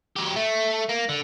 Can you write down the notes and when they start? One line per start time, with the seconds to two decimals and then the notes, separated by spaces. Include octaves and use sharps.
0.16 F#3 G4
0.36 A3
0.89 A#3
1.09 D3